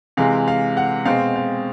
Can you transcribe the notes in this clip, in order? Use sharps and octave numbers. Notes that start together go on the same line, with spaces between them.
C3 E3 G#3 F5
F5
F#5
B2 G#3 C4 F5
F5